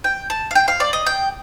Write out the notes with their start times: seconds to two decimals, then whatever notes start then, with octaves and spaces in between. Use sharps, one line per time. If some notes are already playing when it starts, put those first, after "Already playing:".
0.04 G5
0.30 A5
0.51 F5
0.55 G5
0.68 F5
0.80 D5
0.93 D#5
1.06 G5